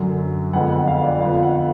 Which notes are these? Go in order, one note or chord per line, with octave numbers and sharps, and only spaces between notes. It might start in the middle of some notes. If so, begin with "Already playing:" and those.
Already playing: F#2 D3 F#3
F2 D3 G#3 B3 F#5
F#5
F5
D5
F2 D3 F3 B3 F5
F#5